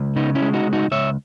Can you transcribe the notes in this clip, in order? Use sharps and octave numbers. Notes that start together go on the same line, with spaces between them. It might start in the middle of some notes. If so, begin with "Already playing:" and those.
Already playing: C#2
C#3 B3 D#4
C#4 E4
G#3
D#4 F#4
C#2
D#4 F#4
C#2 C#5 E5